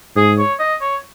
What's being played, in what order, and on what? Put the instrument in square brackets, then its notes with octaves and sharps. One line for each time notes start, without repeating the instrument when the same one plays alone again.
[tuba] G#2 [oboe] G#4
[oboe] C#5
D#5
C#5